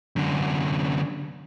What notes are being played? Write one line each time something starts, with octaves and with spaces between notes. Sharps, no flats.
F#2 D3